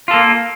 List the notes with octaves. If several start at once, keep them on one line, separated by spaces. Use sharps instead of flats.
A#3 F4 A4